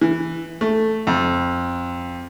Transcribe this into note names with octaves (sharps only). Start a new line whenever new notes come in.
E3
A3
F2